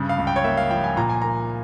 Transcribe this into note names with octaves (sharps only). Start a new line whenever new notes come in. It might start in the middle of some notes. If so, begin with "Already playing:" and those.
Already playing: G2 C#3
F5
C#2
G5
C#5
A#3 E5
F5
F3 G5
G#5
A#2 A#5
G#5
A#3 A#5